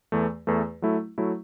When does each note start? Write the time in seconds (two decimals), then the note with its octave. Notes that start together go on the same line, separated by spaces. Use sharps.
0.12 E2 E3 A3
0.47 E2 E3 A3
0.82 F#3 A3 E4
1.18 F#3 A3 E4